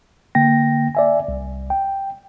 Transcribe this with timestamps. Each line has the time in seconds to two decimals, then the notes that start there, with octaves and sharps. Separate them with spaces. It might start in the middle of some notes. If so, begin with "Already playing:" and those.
0.35 D3 A#3 G5 A#6
0.95 D5 E5 G#5
1.28 C2
1.70 G5